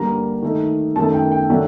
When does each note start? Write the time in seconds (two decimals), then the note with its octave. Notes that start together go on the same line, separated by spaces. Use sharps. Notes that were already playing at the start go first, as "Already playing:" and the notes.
Already playing: G2 D3 G3 A#3 A#5
0.42 D#3 A3 D#4
0.96 F#2 A5
0.98 D#3 A3
1.14 G5
1.32 G5
1.50 D#3 F#3 A3 D4